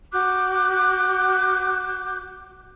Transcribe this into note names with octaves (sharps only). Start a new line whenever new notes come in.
F#4 D6 F#6 G6